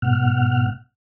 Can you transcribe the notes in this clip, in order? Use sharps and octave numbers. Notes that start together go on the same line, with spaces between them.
G#2 B2 F#5 F6